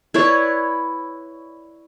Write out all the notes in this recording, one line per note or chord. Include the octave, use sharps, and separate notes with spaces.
E4 B4 C#5 D5